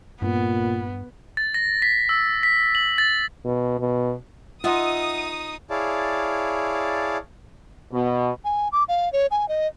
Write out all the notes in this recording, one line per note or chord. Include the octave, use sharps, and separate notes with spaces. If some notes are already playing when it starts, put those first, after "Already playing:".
G2 A#2 B3
A6
A#6
B6
E6
B6
F#7
A6
B2
B2
D#4 F4 D#5 E5 F#5 D#6
E4 G#4 C#5 D5 F5 A5
B2
G#5
D6
F5
C#5
G#5
D#5